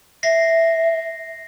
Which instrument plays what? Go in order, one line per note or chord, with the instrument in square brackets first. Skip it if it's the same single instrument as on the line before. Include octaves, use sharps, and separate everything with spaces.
[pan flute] E5 [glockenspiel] A#6 C7